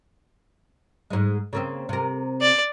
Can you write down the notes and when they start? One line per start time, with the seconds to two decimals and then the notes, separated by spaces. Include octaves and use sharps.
1.10 G#2 G#3
1.53 C#3 A#3 C4
1.89 C3 A#4
2.42 D5